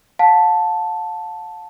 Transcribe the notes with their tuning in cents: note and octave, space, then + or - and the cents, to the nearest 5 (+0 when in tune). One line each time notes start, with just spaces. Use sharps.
F5 +40 A5 +0